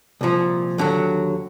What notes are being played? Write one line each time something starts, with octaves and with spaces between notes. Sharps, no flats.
C2 A#2 F3
D#2 D3 F#3